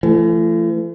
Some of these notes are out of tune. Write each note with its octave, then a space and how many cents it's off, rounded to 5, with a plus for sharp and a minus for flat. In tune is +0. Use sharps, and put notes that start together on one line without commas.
E3 +45 A3 +0